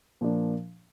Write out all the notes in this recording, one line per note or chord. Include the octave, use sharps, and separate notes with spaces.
A#2 F3 A#3 D4